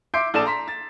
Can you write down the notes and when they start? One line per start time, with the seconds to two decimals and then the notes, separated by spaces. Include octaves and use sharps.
0.14 E5 C6 D6 G6 C7 D7
0.34 A#1 A4 D5 A5 E7
0.46 A#5 C6 B6
0.68 A6